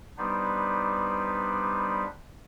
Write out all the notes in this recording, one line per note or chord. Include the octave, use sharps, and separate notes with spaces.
G3 B3 D4 D#4 B4 C5